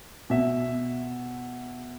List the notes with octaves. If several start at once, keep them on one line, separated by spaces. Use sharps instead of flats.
B2 E5